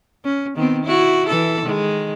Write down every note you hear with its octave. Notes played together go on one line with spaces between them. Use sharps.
C#4
D#3 B3 C4
E4 F#4
E3 A4
D#3 G#3